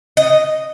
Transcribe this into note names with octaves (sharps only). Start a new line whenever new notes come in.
D#5